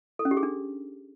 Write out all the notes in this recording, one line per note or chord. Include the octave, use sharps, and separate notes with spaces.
A4
C#4
G4
G#4
D4